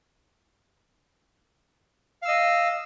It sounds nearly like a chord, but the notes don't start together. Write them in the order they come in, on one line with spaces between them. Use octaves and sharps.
F5 E6 D#5